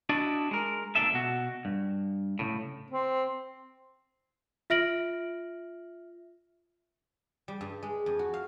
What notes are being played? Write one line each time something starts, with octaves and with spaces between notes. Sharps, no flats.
D4 E4 F#4 D5 D#5
G#3 A#4
C#2 A#2 D4 A4 E5
B2 F#4
G2
A2 C#3
C4
F4 E5 F6 A#6 D7 F#7
G3
G2
G#3
F2
F#4
F5